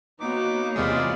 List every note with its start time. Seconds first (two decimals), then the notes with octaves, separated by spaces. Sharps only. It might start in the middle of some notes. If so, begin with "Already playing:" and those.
0.20 A#3 B3 D#4 F#4 C#5 D6
0.76 E2 C3 G#3 F4 D5 D#5 B5